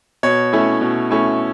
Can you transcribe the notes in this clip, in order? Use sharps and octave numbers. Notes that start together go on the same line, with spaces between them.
B2 C#5
A3 C#4 E4
B2
A3 C#4 E4